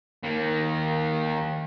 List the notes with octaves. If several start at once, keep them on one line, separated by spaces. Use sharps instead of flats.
D#3 A#3